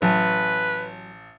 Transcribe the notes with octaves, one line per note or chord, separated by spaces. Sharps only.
A1 F#3 B4 G#5